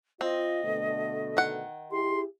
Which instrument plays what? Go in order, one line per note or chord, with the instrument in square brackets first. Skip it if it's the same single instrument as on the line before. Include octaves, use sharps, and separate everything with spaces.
[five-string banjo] C4 [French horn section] F4 [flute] D#5
[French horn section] B2 D3 A3
[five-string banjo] D#3 F#5
[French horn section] E4 G4 G#4 [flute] C6